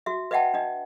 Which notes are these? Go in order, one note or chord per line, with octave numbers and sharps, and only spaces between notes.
F#4 E5
B4 D#5 E5 F#5 G5 A5
D4 D#5